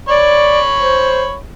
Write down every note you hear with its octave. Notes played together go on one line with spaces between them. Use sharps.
C#5 D5 B5 C#6
C5